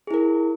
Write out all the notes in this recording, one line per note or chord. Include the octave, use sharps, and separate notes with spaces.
E4 G#4 A#4